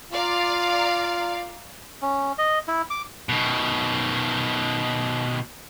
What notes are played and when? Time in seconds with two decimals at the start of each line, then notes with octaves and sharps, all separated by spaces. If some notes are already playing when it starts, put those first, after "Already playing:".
0.13 F4 D5 F5 A#5
2.02 C#4
2.38 D#5
2.68 E4
2.90 D6
3.29 B2 D#3